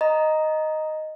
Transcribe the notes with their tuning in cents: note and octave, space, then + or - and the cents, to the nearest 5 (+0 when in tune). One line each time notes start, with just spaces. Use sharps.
D#5 +0 A#5 +0